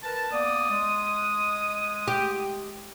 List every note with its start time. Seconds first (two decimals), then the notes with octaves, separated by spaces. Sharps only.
0.04 A#4 B4 A5
0.32 A#3 B3 D5 D#6
0.70 G#3
2.08 G4